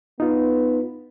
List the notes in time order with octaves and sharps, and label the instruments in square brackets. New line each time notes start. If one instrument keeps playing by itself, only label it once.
[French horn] B3 [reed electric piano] D#4 F4